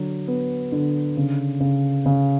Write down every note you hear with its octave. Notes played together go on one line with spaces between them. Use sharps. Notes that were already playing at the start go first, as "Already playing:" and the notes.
Already playing: D3 F#3
B3
D3
C#3
C#3
C#3